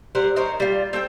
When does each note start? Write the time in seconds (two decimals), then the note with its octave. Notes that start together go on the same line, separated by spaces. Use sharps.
0.15 G3 A#4 C5 F#5
0.36 D#4 A#4 C5 C#5
0.60 G3 F4
0.93 C4 A4 G5